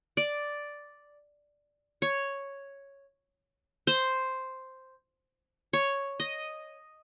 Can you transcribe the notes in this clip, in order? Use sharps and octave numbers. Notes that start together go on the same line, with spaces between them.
D5
C#5
C5
C#5
D#5